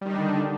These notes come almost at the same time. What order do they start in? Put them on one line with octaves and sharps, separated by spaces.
G3 D#3 D#4 D4 D3